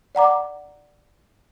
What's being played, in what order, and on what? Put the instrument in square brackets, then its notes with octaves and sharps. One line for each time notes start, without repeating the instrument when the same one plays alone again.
[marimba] D5 F#5 A#5 D6